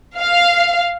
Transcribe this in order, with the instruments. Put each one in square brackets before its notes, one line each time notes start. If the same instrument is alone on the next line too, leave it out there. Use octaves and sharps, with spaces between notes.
[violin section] F5